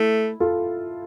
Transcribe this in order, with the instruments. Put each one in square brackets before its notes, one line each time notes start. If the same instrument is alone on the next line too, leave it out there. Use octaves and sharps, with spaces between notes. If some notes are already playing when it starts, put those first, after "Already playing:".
Already playing: [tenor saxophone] A3 [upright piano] E4
[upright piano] F4 A4